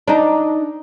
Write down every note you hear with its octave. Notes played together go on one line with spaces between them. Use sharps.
D4 D#4